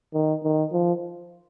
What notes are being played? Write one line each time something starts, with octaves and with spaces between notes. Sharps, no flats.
D#3
D#3
F3